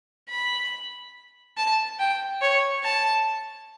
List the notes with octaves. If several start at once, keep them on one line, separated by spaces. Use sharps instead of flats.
B5
A5
G5
C#5
A5